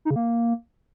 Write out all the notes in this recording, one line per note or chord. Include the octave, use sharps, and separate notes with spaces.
D#4
C#3
A#3